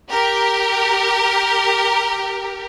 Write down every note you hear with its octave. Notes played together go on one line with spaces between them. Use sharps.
G4 A#4